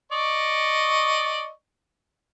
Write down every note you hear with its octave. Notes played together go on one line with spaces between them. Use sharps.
D5 D#5 C#6